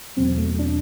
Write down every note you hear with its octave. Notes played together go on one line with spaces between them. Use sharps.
E2 B2 F#3 C4
A3
D4